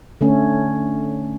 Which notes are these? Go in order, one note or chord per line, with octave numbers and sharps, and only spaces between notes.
D3 A3 C#4